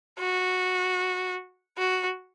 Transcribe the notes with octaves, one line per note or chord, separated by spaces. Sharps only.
F#4
F#4